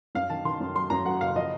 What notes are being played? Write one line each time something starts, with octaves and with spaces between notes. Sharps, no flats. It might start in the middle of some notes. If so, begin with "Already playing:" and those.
F#2 F5
D#3 A5
D#3 C6
F#2
F#3 C6
F#2 A#5
F#3 F#5
F#1 F5
F3 D#5